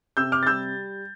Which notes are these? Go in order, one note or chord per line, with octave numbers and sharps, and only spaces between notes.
C3 E6 G6
D6 F6
A6
G3 E6 G6